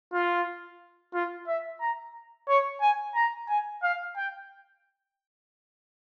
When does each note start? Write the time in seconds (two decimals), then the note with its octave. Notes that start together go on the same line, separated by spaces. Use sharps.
0.14 F4
1.14 F4
1.48 E5
1.81 A#5
2.49 C#5
2.81 G#5
3.15 A#5
3.49 G#5
3.83 F5
4.17 G5